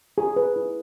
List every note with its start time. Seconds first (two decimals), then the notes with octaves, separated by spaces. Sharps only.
0.18 G#4
0.36 B4
0.56 E4